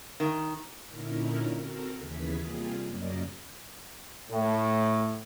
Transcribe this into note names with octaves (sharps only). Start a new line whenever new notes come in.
D#3
A#2 D3 C#4 D#4 E4 A#4
C4 F#4 A4 A#4
D#2 C#3 E3 B3 G#4 B6
C3 G3 A#3 F4 G#4
F#2 C#3 A#3 D5 D#5
A2